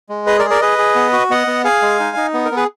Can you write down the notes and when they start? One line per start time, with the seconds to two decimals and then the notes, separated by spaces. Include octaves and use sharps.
0.09 G#3
0.26 G#4 B4 D#5
0.39 A#4 D5
0.45 G#4
0.50 A#4 D5
0.61 G#4 B4 D#5
0.78 G#4
0.95 B3
1.13 F#4
1.30 B3 D#5 F#5
1.47 B3
1.64 G#4 F5 G#5
1.82 G#3
2.00 D#4
2.17 D#4
2.34 B3
2.45 A#4
2.51 B3 G#4 B4